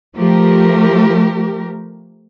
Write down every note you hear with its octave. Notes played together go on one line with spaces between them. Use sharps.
F3 A3 G4 A#4